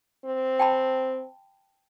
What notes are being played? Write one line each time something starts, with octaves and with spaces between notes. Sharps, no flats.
C4
G5 A5 B5